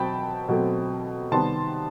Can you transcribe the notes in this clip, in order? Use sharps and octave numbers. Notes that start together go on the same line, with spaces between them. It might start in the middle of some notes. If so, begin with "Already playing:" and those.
Already playing: B2 F#3 C4 G5 A5 B5
B2 F#3 A3 C4
C3 D#3 G3 B3 A5 C6